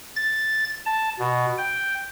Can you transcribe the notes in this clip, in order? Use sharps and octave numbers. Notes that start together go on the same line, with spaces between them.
A6
A5
B2
G5